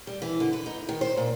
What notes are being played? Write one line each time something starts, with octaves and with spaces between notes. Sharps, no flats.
G3
E3
D3
B4
D#4
D#3
C5
A#2